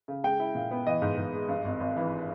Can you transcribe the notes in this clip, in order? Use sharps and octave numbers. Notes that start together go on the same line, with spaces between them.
C#3
G#3 G5
E4
A#2
B3
E3 D#5
G#2
G#2
G#3
G2
G#1
G#1
E3